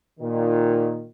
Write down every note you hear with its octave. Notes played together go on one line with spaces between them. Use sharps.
A#2 D#3